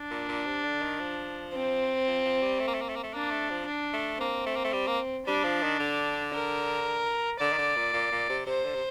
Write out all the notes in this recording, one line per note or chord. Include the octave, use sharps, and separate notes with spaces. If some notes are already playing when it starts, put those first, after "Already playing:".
Already playing: D4
A#2
A#2
C3
D3
D#3
F3
C4
F3
F3
G3
A3
A#3
A3
A#3
A3
A#3
A3
A#3 D4
A3
F3
D4
A3
A#3 C4
A3
A#3
A3
G3
A#3
G3 D4
F3
D#3
D3
A#4
D3 D5
D#3
D3
A#2
A#2
A#2
C3
C3 C5
D3
C3